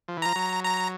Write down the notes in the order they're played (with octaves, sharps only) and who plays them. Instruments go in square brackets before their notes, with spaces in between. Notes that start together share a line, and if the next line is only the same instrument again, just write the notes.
[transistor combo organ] F3
E3
[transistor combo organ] F3 [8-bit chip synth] A#5
[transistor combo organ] F#3
[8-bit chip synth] A#5